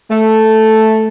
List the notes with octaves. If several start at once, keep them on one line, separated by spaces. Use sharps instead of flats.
A3